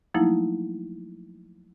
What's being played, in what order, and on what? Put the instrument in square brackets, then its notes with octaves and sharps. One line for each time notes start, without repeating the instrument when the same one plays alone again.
[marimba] F3 F#3 A3 A#3 D#4 E4